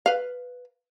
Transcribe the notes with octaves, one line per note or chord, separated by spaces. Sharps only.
B4 F5